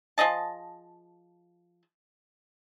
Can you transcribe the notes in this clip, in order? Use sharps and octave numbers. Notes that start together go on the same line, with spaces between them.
F3 G#4 D#5 A5